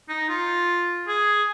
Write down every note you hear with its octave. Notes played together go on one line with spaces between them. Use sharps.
D#4
F4
G#4